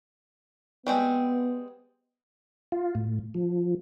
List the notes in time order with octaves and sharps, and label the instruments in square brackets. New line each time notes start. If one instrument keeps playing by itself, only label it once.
[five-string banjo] G3 G#3 C4 [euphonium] B3
[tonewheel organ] F4
A2
F3